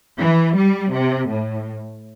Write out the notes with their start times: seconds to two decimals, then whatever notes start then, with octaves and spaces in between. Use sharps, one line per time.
0.18 E3
0.56 G3
0.92 C3
1.29 A2